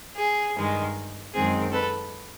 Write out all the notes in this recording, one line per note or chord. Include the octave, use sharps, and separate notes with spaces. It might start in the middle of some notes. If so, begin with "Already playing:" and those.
G#4
G2 D#3 G#3
F#2 D#3 G#3 C4 G#4
A4 B4